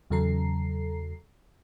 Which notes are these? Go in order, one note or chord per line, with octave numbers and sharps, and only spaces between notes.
E2 C#3 F#3 A4 A#5 C7